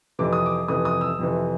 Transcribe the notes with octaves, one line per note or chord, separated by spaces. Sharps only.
F2 C3 E3 D6
D#6
D6
F2 C3 E3 D#6
D#6
E6
F2 C3 E3